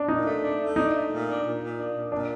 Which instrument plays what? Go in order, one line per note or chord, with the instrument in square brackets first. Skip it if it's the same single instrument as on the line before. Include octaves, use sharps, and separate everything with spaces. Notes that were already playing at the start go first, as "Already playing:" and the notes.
Already playing: [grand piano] D4
[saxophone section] A#2 [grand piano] D#4
[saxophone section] A3
D4
A3
[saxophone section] D4 [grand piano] D#4
[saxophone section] A3
A#2
D4
A#2
A#2
D4
A#2
[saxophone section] A#2 [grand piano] D4